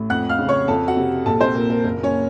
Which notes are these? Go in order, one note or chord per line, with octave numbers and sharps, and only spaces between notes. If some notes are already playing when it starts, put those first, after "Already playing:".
Already playing: A1 A2
F2 F#5 F#6
F5 F6
C#3
C#5 C#6
F2 A4 A5
F#4 F#5
C3
A#1 A4 A5
C4 C5
A#2 A#4
A#4
F#1 A#4
C#4 C#5